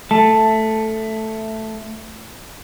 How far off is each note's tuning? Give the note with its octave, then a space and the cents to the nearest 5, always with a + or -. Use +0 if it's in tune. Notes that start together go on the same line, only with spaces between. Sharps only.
A3 +0 A5 +0